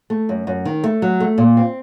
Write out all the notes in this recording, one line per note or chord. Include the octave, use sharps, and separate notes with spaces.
A3
F#2
F#2
D#3
A3
F#3
A3
A#2
C4